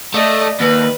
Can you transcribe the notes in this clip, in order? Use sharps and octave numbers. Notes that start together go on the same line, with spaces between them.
A3 D5 D#5
D#2 B4